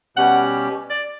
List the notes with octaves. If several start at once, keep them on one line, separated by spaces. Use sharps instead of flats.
B2 G3 C#4 G4 F#5
D5